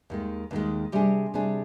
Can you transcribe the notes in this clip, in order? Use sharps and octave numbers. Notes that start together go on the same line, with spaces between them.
D#2 D#3 G#3
D#2 D#3 G#3
C3 G3 D4 G#4
C3 G3 D4 G#4